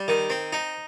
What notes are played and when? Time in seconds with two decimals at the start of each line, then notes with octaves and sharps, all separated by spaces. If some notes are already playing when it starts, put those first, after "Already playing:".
Already playing: G3
0.08 D#3
0.30 C4
0.53 D#4